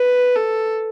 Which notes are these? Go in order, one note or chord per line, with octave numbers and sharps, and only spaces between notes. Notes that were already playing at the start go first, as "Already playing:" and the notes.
Already playing: B4
A4